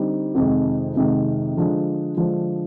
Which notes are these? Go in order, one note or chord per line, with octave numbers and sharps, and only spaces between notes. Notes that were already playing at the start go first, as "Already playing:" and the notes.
Already playing: D3 G3 C4 D#4
F2 C3 D#3 G#3
F2 C3 D#3 G#3
D3 F3 G#3 D4
D3 F3 G#3 D4